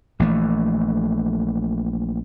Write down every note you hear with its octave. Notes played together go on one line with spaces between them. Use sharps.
A#1 E3 A3